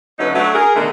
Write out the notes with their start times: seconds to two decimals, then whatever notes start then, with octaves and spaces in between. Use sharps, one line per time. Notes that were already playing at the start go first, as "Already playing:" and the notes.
0.19 D3 F#3 A3 C#4 D#4 B4
0.34 F#3 A3 D4
0.54 G#4 A#4
0.75 B2 D3 D#3 A3 D4 G#4